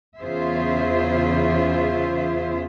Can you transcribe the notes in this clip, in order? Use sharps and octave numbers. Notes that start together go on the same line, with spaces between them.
E2 C#3 F4 G#4 C5 E5